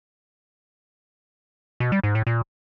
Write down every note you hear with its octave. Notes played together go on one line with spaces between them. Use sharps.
B2
G3
G#2
A2
A#2